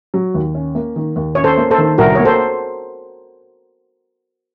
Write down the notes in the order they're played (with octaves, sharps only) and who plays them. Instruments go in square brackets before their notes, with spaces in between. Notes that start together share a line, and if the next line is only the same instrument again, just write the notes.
[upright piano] F#3
D#2
C#4
A#3
D#3
D#2
[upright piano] C#4 [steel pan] C#5
[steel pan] A4 C5
[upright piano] A#3
[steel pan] A4 C5
[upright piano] D#3
[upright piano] C2 [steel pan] F#4 A#4
[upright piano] A#3 [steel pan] C#5
[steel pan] A4 C5